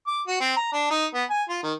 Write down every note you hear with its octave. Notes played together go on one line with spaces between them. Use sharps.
D6
F#4
C4
A#5
D4
D#4
B3
G#5
F4
D#3